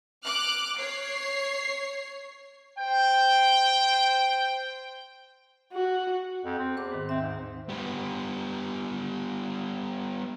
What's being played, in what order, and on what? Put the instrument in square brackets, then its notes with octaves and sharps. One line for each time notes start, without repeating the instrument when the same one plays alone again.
[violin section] D6 F6 F#6
C#5 C7
[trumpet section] C5 G5
[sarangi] F#4
[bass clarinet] F2
C4
[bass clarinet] E2 [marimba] C5 D6
[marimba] G#2 D#3
[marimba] D#2 E5 [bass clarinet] C4
[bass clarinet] G#2
[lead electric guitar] G3 B3